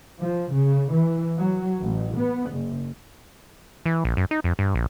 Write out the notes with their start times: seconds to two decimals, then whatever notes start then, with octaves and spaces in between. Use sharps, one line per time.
0.20 F3
0.51 C#3
0.93 E3
1.37 F#3
1.81 A1
2.17 B3
2.51 F#1
3.86 E3
4.05 A#1
4.17 F#2
4.31 D#4
4.44 F2
4.59 G2
4.75 A#1